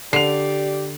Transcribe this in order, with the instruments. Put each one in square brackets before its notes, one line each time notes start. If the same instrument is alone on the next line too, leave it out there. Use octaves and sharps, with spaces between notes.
[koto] D3 [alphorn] G4 [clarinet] D5 [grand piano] C7 F7